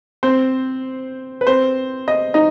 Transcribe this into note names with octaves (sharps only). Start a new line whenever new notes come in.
C4 C5
B4
C4 C5
D#5
D#4 D#5